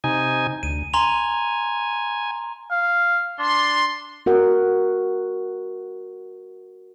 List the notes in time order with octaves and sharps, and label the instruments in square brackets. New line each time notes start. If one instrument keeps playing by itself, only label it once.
[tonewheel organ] C3 D#4 G#5
[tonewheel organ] D2 [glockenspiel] D#7
[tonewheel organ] G#5 [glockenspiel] A#5 C6 F7
[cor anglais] F5
[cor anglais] D4 [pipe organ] C6
[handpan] F#4 A#4 F#5